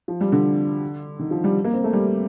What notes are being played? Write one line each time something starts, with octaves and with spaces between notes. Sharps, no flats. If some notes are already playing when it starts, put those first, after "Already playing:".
F3
G3
D3
D#3
F3
G3
A#3
C4
A3
G3